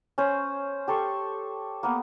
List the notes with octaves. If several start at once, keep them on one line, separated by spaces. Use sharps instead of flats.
C#4 C5
G4 A4 C6 C#6
A#3 B3